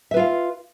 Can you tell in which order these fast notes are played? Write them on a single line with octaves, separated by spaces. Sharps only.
E5 B4 F4 F5